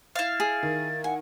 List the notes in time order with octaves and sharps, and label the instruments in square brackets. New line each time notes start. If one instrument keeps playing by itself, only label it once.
[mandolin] E4 F5 [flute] A6
[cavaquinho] G#4
[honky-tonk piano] D#3
[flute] F#5 [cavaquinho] G#5